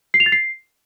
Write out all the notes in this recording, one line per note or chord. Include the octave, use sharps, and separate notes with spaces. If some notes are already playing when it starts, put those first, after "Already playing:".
C7
F7
A6
C7